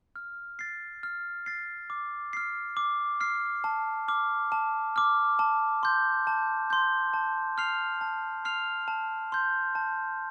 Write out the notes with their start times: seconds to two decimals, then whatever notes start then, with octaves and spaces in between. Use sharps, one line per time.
0.16 F6
0.59 A6 C7
1.03 F6
1.46 A6 C7
1.90 D6
2.33 F6 C7
2.77 D6
3.21 F6 C7
3.64 A5
4.08 D6 F6
4.52 A5
4.96 D6 F6
5.39 A5
5.83 C6 G6
6.27 A5
6.70 C6 G6
7.14 A5
7.57 C6 F6 C7 F7
8.01 A5
8.44 C6 F6 C7 F7
8.88 A5
9.32 C6 G6
9.75 A5